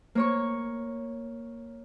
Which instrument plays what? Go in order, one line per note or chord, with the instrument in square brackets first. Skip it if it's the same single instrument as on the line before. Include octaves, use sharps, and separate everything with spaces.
[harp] A#3 C#5 C#6